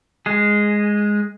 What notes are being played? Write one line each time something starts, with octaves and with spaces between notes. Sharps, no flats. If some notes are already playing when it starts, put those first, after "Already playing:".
G#3 G#4